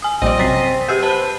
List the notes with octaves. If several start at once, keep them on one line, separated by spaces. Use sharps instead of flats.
G#5 D#6
A#1 G3 C4 D5 D#5
F#2 C3 F#3 A6 B6 C7
B3 G4 G#4 E6 G6
B4 C5 A5